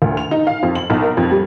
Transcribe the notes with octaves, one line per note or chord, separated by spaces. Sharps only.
D2
F7
D#4
F5
F2
F#7
B1
A#4
F2
G3